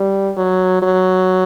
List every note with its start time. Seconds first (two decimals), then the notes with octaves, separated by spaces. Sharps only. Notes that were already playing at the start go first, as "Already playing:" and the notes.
Already playing: G3
0.37 F#3
0.82 F#3